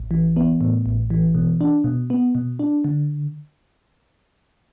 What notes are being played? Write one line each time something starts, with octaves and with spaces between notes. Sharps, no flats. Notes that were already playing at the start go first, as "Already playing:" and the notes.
Already playing: A1
E3
B3
A2
A1
E3
B2
D4
B2
B3
B2
D4
D3